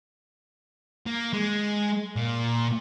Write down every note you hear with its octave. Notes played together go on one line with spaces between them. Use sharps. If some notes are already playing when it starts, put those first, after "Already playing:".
A#3
G#3
A#2